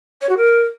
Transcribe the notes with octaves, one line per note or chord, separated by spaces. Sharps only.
C#5
F#4
A#4